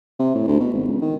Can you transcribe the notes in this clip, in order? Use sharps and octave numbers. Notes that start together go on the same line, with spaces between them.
C3
A2
D2
B2
G#1
C#2
D#3